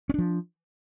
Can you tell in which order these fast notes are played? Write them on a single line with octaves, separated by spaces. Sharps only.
C#4 D4 F3